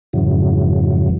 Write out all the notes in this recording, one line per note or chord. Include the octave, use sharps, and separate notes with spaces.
F2 G#2 C#3 E3 F#3